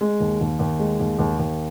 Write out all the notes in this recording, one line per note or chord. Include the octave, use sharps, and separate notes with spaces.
G#3
D#2
D#2
D#2
G#3
D#2
D#2
D#2